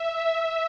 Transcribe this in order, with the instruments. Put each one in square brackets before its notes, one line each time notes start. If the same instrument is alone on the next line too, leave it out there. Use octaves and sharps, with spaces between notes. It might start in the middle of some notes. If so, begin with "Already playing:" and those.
Already playing: [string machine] E5